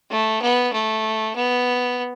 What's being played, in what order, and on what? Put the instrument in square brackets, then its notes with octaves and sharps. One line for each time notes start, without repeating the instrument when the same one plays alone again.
[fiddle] A3
B3
A3
B3